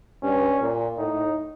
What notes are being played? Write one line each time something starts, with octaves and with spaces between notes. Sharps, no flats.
G2 C#4
A#2
A2 D#4